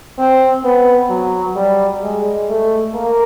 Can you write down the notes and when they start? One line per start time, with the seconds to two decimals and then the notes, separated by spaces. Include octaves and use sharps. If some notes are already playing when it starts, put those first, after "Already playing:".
0.19 C4
0.65 B3
1.10 F#3
1.56 G3
2.03 G#3
2.49 A3
2.95 A#3